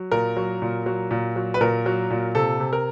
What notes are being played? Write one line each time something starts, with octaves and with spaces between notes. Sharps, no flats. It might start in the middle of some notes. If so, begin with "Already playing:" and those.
Already playing: F#3
A#2 A#4
F#3
A#2
F#3
A#2
F#3
B4
A#2 A#4
F#3
A#2
C3 A4
C3
A#4